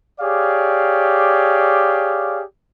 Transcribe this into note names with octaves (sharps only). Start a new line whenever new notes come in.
G4 G#4 C#5 D5 F5